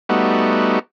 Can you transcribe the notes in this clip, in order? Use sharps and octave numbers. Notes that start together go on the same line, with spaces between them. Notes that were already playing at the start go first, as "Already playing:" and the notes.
G3 A3 B3 D#4 F#4